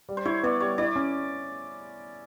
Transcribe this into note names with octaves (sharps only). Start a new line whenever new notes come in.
G3
C5
E4 C#5
B3 D5
G3 C#5
E4 D5
C#4